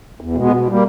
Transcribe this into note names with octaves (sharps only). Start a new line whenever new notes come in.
E2
B2 G#3 B3
B2
G3 A#3